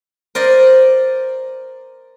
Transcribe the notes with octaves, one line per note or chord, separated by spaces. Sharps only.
A#4 C5 D5 D#5